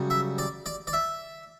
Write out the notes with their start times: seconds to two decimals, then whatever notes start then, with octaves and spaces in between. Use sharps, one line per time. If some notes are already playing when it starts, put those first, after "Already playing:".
Already playing: F#2 C#3 G3
0.10 E5
0.38 D5
0.66 D5
0.87 D5
0.93 E5